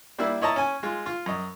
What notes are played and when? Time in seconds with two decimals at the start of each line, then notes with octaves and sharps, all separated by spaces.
0.19 G3 A#3 D4 E4 E5
0.41 E4 C#5 D#5 A5 A#5
0.56 C#4 G#5
0.83 G#3 F4
1.06 F4
1.26 F#2 D#5